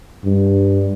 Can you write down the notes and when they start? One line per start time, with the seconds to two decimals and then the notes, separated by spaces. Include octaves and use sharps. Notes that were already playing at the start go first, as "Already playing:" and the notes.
0.24 G2